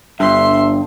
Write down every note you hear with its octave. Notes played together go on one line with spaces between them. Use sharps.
G1 G2 E5 C6